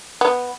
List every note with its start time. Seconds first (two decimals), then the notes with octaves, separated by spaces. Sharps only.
0.21 B3